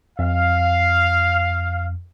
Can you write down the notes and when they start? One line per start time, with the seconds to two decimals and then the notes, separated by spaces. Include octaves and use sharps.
0.19 F2 F5